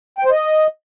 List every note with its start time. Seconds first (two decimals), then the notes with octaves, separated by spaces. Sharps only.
0.18 G5
0.25 C5
0.31 D#5